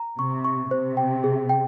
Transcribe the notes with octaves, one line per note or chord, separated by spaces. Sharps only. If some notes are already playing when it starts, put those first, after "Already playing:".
Already playing: A#5
C3 C#6
C#6
C3 C5
G5
G#4
G5